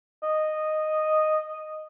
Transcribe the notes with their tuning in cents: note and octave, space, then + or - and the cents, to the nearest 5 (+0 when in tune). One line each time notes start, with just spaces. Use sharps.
D#5 -5